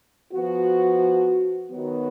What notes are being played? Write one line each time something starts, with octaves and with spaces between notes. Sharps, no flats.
F3 B3 F#4
D#3 F#3 B3 F#4